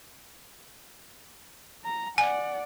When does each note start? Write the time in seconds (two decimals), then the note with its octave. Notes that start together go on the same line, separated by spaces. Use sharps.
1.85 A#5
2.18 D5 F#5 G#5